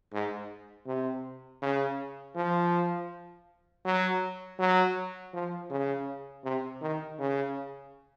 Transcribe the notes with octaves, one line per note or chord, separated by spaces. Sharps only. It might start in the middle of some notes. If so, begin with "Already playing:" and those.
G#2
C3
C#3
F3
F#3
F#3
F3
C#3
C3
D#3
C#3